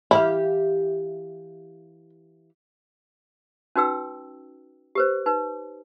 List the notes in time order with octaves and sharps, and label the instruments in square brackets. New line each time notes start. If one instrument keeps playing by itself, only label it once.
[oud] E3 G4 F5 [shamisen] E4
[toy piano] C#4 D#4 F#4 B4 G5 E6
G4 B4 C5
D#4 B4